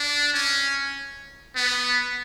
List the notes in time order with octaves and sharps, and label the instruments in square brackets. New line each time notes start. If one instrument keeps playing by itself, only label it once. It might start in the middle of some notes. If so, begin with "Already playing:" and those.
Already playing: [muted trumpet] D4
C#4
B3